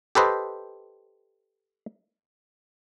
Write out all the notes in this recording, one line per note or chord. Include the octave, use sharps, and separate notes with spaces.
G4 A4 B4 C5 D#5